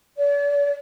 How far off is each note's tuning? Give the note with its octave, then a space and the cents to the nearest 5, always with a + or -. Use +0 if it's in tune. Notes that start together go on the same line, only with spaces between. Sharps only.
D5 -45